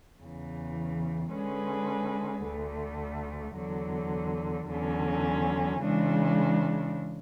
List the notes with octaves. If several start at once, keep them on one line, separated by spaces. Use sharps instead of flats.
E2 C#3 E3
D3 G#3 C#4 G#4 B4
D2 D3 A3
E2 D3 F#3
E2 D3 F#3 C#4
C#3 E3 G#3 D4